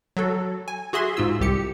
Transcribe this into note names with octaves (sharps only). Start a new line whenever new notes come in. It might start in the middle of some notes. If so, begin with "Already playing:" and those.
F#3 F#4 A4
G#5
F#4 G#4 E5 C6
G#2 F4 E6
C2 G4 C#7